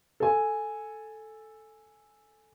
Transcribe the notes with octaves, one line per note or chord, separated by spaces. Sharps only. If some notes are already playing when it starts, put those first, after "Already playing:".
A4 G#5